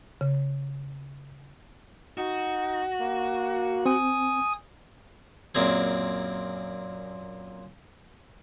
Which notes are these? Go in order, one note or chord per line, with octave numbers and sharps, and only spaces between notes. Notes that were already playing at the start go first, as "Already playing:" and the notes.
C#3
D#4 F#4
A#3
C4 G#5 D#6
F#2 A#2 C4 G#4